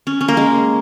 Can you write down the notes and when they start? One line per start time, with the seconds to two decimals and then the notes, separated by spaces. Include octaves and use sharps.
0.07 C#4
0.21 C#4
0.28 A#3
0.37 G#3